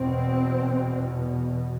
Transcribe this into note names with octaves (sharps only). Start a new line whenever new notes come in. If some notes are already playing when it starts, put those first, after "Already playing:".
Already playing: E2 B2 C4